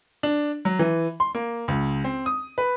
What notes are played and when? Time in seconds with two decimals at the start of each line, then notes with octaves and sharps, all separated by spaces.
0.23 D4
0.65 F#3
0.79 E3
1.20 C6
1.35 A#3
1.68 C#2
2.04 C4
2.26 D#6
2.58 B4